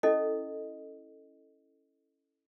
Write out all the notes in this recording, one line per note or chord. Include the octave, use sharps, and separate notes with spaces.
C#4 E4 A4 D#5